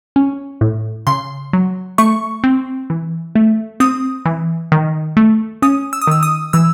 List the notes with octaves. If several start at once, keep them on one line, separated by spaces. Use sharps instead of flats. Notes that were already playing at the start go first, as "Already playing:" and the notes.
C#4
A2
C#3 C6
F#3
A3 C#6
C4
E3
A3
C4 D#6
E3
D#3
A3
C#4 D#6
E6
D#6
D#3 E6
D#6
E3 E6